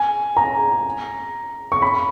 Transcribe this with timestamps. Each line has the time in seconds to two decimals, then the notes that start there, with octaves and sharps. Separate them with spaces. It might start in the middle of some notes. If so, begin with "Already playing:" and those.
Already playing: G#5
0.37 A#5
1.72 C#6
1.82 B5